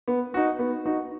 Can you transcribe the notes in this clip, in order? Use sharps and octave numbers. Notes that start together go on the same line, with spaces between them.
B3
D#4 F#4
B3
D#4 F#4